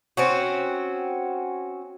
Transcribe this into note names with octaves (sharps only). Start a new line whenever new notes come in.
C4 C#4 F#4